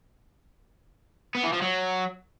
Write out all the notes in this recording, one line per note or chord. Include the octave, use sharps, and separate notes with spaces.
B3
E3
F3
F#3